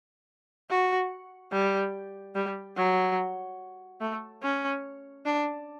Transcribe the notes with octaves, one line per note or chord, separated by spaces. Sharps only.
F#4
G3
G3
F#3
A3
C#4
D4